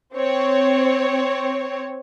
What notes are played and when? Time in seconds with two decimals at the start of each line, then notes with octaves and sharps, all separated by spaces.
0.16 C4 C#5